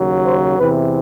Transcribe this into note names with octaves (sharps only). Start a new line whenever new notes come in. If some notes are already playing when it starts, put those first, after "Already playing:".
Already playing: D#2 C#3 F#3
C5
E2 C3 E3 B4